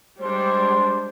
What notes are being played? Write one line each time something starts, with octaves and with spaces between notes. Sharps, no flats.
G3 G#3 D4 C5